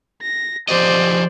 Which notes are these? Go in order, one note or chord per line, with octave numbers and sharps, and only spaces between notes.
A#6
F3 G4 C5 D5 D#5